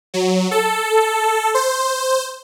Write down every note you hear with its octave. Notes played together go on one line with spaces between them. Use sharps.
F#3
A4
C5